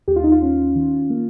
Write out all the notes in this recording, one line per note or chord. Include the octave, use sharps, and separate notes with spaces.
D#2 G4
F4
D#4
F4
C#4
D#3
A#3